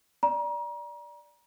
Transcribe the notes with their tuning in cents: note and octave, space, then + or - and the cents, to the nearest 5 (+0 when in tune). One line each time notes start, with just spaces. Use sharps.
D5 +0 A#5 +35